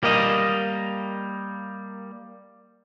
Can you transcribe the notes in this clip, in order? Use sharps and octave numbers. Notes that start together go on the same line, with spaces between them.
G3 A#3 A#4 D#5